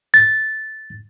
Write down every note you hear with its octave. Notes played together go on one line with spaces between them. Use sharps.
A6